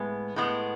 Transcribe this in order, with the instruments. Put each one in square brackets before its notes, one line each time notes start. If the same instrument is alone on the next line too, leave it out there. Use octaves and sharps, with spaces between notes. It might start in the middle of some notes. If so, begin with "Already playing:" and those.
Already playing: [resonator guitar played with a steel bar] A2 G#3 B3
A2 G#3 B3